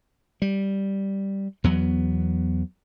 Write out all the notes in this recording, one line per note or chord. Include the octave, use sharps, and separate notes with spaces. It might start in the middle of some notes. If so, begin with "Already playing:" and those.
G3
E2 F#3 B3